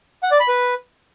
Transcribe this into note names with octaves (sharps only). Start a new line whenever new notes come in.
F#5
D5
B5
B4